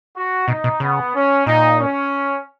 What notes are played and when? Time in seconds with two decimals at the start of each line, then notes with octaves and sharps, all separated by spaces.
0.15 F#4
0.48 B2 D#4
0.64 B2
0.80 C#3 B3
1.14 C#4
1.46 A#2 D#4
1.79 C#4